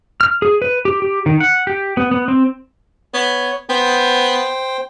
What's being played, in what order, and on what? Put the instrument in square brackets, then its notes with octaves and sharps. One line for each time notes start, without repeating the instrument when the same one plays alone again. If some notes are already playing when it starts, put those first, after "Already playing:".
[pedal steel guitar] F6
G#4
B4
G4
G4
D#3
F#5
G4
B3
B3
C4
[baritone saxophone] B3 [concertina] C#5
[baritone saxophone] B3 [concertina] C5 G5